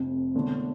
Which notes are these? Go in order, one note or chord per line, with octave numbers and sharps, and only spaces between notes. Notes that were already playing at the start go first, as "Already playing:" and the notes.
Already playing: F1 F2 C3
E1 E2 D3 A3